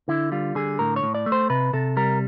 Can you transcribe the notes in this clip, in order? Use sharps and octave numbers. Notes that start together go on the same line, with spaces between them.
D3 E4
G3 F4
D3 G#4
A2 A#4
C#5
A2
D5
A3
C5
C3 B4
C3 A4
G3 A#4